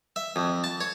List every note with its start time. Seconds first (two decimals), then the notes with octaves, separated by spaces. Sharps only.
0.16 E5
0.36 F2
0.64 A5
0.81 C#5